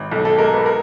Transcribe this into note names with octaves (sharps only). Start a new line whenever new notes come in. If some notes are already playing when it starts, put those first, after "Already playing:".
Already playing: G#1
B1 A4
A4
G#3 A#4
B4
A#4